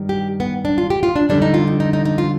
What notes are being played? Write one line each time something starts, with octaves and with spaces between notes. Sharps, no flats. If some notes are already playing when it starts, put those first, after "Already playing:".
Already playing: G2 D#3 G3
G4
B3
D4
F4
G4
F4
D4
F2 D3 G3 D4
D#4
F4
D#4
D#4
D#4
D#4
F4